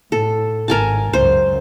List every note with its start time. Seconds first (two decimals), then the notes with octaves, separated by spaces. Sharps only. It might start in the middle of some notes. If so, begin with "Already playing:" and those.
0.12 A2 A4
0.68 G#1 A#4 G#5 A5
1.13 C#2 F#2 C5